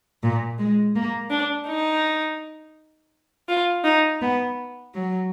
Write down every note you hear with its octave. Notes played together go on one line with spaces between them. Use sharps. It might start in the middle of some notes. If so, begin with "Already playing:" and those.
A#2
G#3
A#3
D4
D#4
F4
D#4
B3
F#3